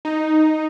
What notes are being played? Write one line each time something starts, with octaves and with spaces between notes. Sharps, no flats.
D#4